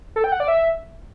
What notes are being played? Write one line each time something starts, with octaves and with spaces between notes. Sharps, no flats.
A4
G5
F#5
D5
E5